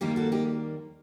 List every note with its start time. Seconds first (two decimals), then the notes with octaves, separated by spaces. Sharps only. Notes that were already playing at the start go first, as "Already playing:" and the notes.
0.01 D#2 D#3 G3 A#3 D#4 G4
0.16 F#4 A4
0.32 D#4 G4